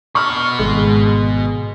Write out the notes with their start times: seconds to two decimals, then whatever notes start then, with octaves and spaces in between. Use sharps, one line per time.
0.15 B2 B5 C#6 F6
0.59 G#1 G#3